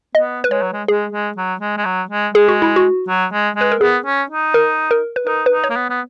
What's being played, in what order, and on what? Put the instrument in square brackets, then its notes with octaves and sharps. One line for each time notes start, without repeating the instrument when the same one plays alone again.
[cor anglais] B3 [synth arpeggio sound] D#5
[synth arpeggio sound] B4
[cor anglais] G#3 [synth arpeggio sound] C#5
[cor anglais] F#3
G#3
[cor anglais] G#3 [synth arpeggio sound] G#4
[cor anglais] G#3
F#3
G#3
G#3
F#3
G#3
[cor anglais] G#3 [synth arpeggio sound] G#4
[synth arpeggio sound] F#4
E4
F#4
[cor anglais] F#3
G#3
[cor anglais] G#3 [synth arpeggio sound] B4
[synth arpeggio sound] A#4
[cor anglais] B3 [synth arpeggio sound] G#4
[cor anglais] C#4
D#4
[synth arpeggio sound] A#4
A#4
B4
[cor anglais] D#4 [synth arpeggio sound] A#4
[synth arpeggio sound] B4
[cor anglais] D#4
[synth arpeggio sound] C#5
[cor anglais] A#3
B3
B3